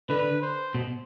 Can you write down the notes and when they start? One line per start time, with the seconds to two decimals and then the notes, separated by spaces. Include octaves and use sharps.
0.09 D3 B4
0.42 C5
0.75 B2